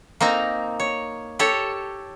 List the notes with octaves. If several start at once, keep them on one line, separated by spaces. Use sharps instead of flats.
A#3 C4 D#4 A#5
C#5
G4 A4 C#5